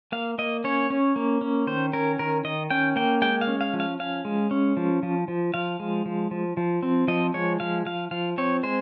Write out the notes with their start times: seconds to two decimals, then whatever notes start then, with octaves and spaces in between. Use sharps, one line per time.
0.12 A#3 F5
0.38 A#3 D#5
0.64 C#4 C#5
0.90 C#4
1.16 A#3
1.41 C#4
1.67 D#3 C5
1.93 C#4 A#4
2.19 D#3 A#4
2.44 D#3 D#5
2.70 C#4 G5
2.96 A#3 G5
3.22 G#3 G5
3.41 F5
3.47 C#4
3.61 F5
3.73 F3
3.80 F5
4.00 C#4 F5
4.25 G#3
4.51 C#4
4.77 F3
5.03 F3
5.28 F3
5.54 F3 F5
5.80 G#3
6.06 F3
6.31 F3
6.57 F3
6.83 C4
7.08 F3 D#5
7.34 G#3 C#5
7.60 F3 F5
7.86 F3 F5
8.11 F3 F5
8.38 C4 C#5
8.63 G#3 C5